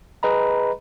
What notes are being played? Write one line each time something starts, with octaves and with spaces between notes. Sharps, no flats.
G#4 B4 D#5 A#5 B5